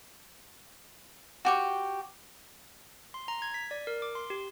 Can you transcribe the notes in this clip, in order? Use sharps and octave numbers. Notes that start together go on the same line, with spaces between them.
F#4 G4 C#6
C6
A#5
G#6
B6
D5
A#4
D6
C6
G4